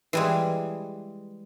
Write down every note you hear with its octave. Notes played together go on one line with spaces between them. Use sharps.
E3 G3 G#3